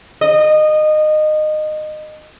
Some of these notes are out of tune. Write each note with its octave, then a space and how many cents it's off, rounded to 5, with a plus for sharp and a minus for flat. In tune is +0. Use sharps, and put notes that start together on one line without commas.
D#5 -20